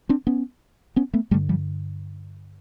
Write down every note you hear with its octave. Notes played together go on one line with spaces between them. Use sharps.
C4 D4
B3 C#4
B3 C#4
A3 B3
G2 D3 G3 A3
F3 G3